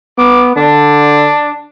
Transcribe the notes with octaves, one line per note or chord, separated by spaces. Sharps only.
B3 D6
D3 D4